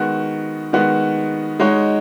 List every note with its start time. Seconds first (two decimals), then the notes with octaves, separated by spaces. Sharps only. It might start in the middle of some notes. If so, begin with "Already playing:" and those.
Already playing: D#3 G#3 B3 F#4
0.73 D#3 G#3 B3 F#4
1.60 G#3 D#4 F#4 C#5